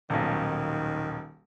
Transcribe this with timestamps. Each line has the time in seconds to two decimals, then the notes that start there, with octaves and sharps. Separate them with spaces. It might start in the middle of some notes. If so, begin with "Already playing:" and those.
0.10 D#1 B1 D#3